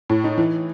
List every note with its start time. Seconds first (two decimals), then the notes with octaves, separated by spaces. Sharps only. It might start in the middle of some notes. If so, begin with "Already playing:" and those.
0.10 A2
0.24 D#4
0.38 E3